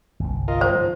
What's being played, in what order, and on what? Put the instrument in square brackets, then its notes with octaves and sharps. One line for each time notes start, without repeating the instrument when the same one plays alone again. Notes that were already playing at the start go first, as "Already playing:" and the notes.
[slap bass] G1 C2
[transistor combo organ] F4 A#4 D#5
[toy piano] C5
[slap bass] G#2 [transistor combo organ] F3